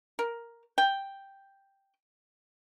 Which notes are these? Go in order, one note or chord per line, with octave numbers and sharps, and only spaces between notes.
A#4
G5